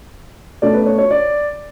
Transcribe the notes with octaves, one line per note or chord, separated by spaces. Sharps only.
B2 A3 C#4 D5
B4
C#5
C#5
D5